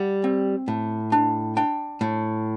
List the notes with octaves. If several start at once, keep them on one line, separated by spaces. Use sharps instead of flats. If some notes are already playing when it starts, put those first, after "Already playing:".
Already playing: G3 F#5
C4
A2
D4
D4 G5
A2